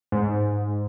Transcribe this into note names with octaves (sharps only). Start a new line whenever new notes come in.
G#2